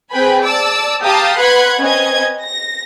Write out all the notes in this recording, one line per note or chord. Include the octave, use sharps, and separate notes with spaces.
C4 G#4 B4 G5 G#5 B5
D5 A5 D6 E6
G4 F5 A5 A#5 D#6
B4 F#5 B5 C6 F#6 G#6
C4 C#4 B4 D#5 G#6
A#6